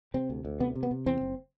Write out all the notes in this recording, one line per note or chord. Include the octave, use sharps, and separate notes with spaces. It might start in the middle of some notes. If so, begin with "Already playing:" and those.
C3 C4
D2
D2
C3 B3
C3
B3
C3
E2 C4
F#1